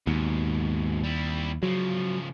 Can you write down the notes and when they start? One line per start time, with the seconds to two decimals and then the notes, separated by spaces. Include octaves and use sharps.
0.07 D#2 G#2 B2
1.04 G3 E4
1.63 C#3 F3 F#3